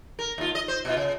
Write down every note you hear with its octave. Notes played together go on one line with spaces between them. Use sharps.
A#4
D#2 F4
D#5
C5
B2 D#3 F4
C#3